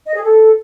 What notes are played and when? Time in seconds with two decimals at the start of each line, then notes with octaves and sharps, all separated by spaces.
0.06 D#5
0.14 G#4
0.22 A4